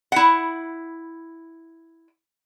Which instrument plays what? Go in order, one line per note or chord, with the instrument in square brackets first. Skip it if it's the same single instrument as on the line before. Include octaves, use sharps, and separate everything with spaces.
[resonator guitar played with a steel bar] E4 F#5